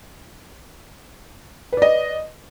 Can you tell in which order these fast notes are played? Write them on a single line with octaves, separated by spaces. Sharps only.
B4 D5 D#5